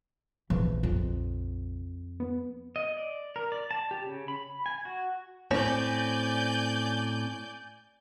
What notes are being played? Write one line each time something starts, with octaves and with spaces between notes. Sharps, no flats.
A#1 C#3 E3 F3
F2
B3
D#5
D5
A#4
D5
A5
G4
C#3
B5
G#5
F#4
A2 C4 C#4 D5 G#5 G6